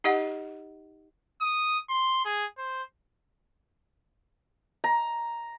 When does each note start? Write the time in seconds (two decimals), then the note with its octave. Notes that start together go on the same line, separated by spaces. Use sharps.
0.04 D#4 G4 D#5 F#5
1.41 D#6
1.89 C6
2.25 G#4
2.58 C5
4.84 A#5